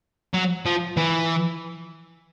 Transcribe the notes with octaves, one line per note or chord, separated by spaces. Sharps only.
F#3
F3
E3